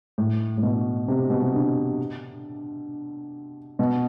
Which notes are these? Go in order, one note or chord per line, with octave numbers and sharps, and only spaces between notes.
A2
A2
B2
C3
B2
C3
D3
B2